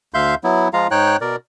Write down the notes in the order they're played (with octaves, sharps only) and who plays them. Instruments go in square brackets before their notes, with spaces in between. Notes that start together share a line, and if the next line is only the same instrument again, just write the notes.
[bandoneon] D2 E5 F5 C6 G6
F#3 B3 E4
F3 G#3 F4 F5 A#5
G#2 D#4 C#5 G5 F#6
B2 A#4 D5